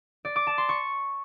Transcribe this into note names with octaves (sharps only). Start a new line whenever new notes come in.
D5
D6
A5
C6
C#6